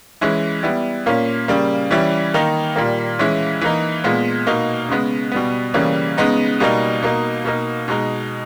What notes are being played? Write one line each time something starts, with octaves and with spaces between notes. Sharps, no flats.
E3 G#3 C#4 E4
G3 B3 E4
A#2 A#3 C#4
C#3 G3 A#3
E3 G3 C#4 E4
D#3 A#3 D#4
A#2 G3 A#3
E3 G#3 C#4 E4
E3 A#3 D#4
A#2 G#3 B3
B2 A#3 D#4
C#3 G#3 B3
B2 G3 B3
C#3 E3 G3 A#3 C#4
C#3 G#3 B3 D#4
B2 G3 A#3 D#4
B2 A#3 D#4
B2 A#3 D#4
B2 G#3 D#4